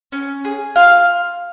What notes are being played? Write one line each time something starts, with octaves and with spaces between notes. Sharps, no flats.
C#4
G#4
F4 F5